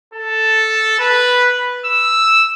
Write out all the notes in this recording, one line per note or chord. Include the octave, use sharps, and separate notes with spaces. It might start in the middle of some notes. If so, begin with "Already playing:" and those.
A4
B4
E6